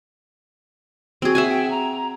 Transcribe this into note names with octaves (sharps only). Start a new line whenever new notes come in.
C4 F#4 G#4
E5 F#5 G#5
G5
A#5